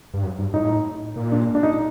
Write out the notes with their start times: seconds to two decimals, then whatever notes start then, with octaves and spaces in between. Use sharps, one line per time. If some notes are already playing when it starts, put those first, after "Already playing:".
0.14 G2
0.23 F#2
0.39 G2
0.53 A2 D#4
1.16 A#2
1.32 D4
1.55 D4
1.63 D#4